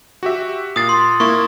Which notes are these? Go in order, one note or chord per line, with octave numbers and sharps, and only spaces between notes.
F#4 G4 E5
A#2 D#6 A6 C7
C6
A#3 E4 C#6